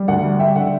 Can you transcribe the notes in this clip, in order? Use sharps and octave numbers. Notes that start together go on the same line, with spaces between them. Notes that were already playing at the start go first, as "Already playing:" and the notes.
Already playing: G3
D2 F#5
G3
G3 E5 G5
D3 F#5